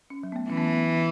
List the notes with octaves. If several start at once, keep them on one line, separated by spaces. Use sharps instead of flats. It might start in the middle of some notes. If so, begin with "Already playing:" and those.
C#4
F#3
B3
A3
E3 C#4
B3
A3
B3